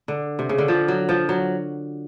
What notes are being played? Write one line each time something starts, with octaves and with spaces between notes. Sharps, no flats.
D3
C3
C#3
D3
F3
F#3
F3
F#3